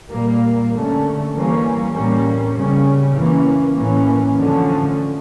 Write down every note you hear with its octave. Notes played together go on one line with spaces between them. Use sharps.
A#2 G3 A#3
D3 A3 C#4
E3 G3 A#3 C#4
A2 G3 A#3 C#4
C#3 G3 C#4
E3 A#3 C#4
A2 E3 A#3 C#4
D3 F3 A3 C#4